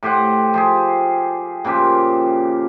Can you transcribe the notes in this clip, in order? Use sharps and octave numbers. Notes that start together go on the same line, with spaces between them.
A2 G4 C5 F#5
F3 G4 G#4
A#2 C#3 F3 G4